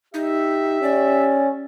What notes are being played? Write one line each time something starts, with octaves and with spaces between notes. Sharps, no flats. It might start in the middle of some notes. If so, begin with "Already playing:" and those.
D#4 G4 E5
C#4 D5